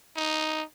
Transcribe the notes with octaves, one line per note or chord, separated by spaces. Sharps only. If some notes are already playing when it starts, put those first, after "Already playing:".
D#4